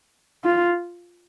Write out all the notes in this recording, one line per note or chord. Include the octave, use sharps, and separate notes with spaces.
F4